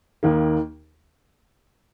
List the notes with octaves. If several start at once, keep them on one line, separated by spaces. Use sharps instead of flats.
D#2 D#3 A#3